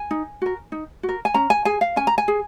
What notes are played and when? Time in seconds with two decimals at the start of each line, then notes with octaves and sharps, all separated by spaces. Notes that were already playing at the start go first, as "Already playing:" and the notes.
Already playing: G#5
0.11 D#4
0.42 F#4 A#4
0.72 D#4
1.03 F#4
1.09 A#4
1.25 G#5
1.34 C#4 A#5
1.50 G#5
1.65 G#4 G#5
1.81 F5
1.96 C#4 G#5
2.07 A#5
2.18 G#5
2.28 G#4